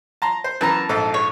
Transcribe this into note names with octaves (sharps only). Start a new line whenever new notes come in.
A5 A#5 C6
C5
F#2 E3 A5 A#5
A#1 G#2 A4
C#5